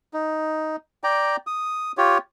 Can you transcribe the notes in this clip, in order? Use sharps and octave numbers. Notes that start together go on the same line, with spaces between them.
D#4
D5 G5 A#5
D#6
F4 G4 C#5